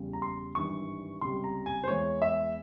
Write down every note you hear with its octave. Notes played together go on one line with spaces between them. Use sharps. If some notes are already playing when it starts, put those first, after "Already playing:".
Already playing: E2 C#3 G3
A#5
C6
G#1 G2 E3 G3 C#6
C#2 C3 G3 C6
A#5
G#5
C5
E2 E3 G#3 C#5
E5